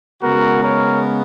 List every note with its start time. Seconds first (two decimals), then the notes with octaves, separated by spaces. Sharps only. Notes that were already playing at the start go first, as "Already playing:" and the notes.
0.22 C#3 G#3 B3 F#4 A#4
0.63 A#4 C#5